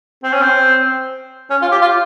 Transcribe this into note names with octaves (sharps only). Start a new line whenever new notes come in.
C4
C#4
C4
C#4
F4
G4
F4